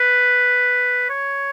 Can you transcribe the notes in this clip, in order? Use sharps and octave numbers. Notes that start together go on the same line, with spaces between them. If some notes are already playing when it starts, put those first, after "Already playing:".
Already playing: B4
C#5